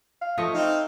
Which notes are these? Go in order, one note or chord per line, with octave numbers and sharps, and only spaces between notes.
F5
F3 A3 C#5 D#5
C4 D#4 F5